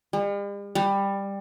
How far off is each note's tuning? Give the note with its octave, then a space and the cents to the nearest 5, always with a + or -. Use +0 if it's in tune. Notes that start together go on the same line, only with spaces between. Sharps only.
G3 +45
G3 +15